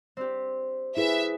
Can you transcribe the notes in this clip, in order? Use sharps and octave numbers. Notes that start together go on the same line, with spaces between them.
C4 D4 G4
E4 G#4 B4 E5